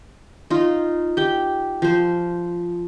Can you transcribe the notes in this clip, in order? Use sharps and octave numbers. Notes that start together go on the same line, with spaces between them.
D#4 F4
G4 G5
F3 C5